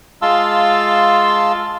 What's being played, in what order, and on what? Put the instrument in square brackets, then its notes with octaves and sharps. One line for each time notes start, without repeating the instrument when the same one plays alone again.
[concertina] G#3 F4 F5 A5 C6 E6